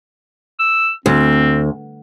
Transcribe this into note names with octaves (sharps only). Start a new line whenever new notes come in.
E6
D2 C4